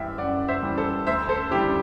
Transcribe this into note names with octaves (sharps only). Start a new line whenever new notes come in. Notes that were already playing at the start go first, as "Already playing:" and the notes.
Already playing: F#2 E3 G3 E5 G5
F#2 D5 F#5
C5 E5
E3 G3
A4 C5
D2 C5 E5
A4 C5
D3 G3 E4 G4